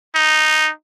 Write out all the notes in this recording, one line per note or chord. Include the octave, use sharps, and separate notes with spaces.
D#4